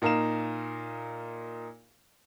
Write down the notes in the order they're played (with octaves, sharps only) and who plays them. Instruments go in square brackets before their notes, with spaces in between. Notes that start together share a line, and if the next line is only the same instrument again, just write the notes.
[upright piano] A#2 D#4 A#4 F5 A#5 E7